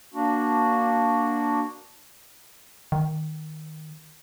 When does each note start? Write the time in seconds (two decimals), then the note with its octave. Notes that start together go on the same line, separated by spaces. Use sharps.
0.14 A#3 D4 F#4
2.92 D#3